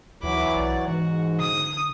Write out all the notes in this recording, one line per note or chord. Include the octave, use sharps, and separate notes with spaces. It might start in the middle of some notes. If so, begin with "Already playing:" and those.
D2 E3 F#3 B5 D6
B1 D5
G#2 E3 F#4
D3 D#6